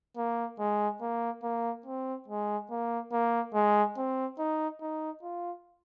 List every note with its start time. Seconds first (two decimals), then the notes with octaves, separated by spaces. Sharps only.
0.17 A#3
0.59 G#3
1.01 A#3
1.43 A#3
1.86 C4
2.28 G#3
2.71 A#3
3.12 A#3
3.54 G#3
3.97 C4
4.39 D#4
4.81 D#4
5.23 F4